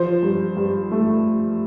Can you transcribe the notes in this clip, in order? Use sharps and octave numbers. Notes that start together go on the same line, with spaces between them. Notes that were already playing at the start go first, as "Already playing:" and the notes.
Already playing: F3 C5
G2
G2
A3